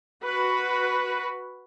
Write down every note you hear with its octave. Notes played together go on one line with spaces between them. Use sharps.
F#4 B4